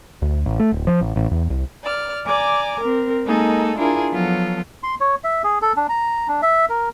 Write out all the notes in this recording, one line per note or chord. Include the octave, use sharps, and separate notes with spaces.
D2
A1
A3
D1
F3
A1
A1
E2
C2
D5 F6
D5 G#5 A#5 D6
C4 A#4
G#3 A#3 D#4 G#4 A4
D4 E4 F4 G#4 A#4
F3 F#3 B3 F4 A4
C6
C#5
E5
G#4
A4
D4
A#5
D4
E5
A#4